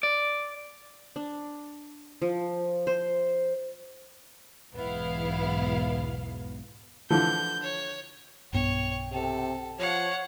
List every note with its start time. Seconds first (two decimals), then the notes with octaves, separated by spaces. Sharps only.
0.03 D5
1.16 D4
2.22 F3
2.87 C5
4.74 B1 E2 G#2 B3 E4 F5
7.10 D3 E3 F3 G6
7.63 C#5
8.53 B1 G2 B3 C#5 G5
9.12 C3 A4
9.79 F3 C#5 F5 F#5